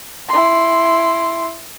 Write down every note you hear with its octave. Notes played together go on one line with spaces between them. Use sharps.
E4 C6